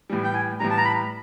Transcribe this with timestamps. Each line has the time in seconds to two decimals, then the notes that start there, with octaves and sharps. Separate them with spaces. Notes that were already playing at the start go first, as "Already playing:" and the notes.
0.10 A2 E3 G3
0.24 G5
0.34 G#5
0.60 A2 E3 G3 A#5
0.70 A5
0.78 A#5
0.85 B5